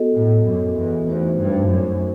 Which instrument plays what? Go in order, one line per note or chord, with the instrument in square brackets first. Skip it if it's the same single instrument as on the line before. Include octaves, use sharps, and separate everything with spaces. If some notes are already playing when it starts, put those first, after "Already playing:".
Already playing: [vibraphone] B3 F#4 A4 D#5
[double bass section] A2
F#2
E2
[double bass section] E2 [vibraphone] A3 D#4 F#4 C5
[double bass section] G2
F#2